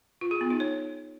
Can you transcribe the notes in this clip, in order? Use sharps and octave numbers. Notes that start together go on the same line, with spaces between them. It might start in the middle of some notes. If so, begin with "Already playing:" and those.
F4
G#4
B3
D#4
C#5